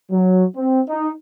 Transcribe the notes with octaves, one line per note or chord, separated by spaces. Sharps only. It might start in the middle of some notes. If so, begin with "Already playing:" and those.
F#3
C4
D#4